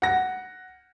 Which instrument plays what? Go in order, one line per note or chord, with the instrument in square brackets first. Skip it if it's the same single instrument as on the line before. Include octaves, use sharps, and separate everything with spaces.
[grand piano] F#5 A#6